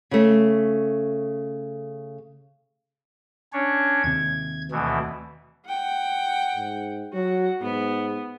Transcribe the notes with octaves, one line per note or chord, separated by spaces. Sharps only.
C#3 A3
C#4 D4 C#5
D#2 C3 G#6
D2 B2 E3
F#5 G5
G#2
F#3 F#4
G#2 B3